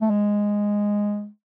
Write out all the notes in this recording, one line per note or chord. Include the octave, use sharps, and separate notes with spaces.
A3
G#3